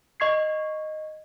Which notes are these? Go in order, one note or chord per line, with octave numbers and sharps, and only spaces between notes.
D#5 C#6 G#6 C7